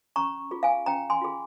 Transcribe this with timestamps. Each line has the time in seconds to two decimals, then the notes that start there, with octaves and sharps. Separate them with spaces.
0.16 C#4 A#5 C#6
0.51 F4 G#4
0.63 F5 G#5
0.86 C#4 G5 A#5
1.10 G#5 C6
1.21 F4 G#4